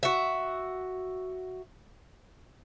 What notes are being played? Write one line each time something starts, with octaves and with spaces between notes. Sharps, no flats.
F#4 E5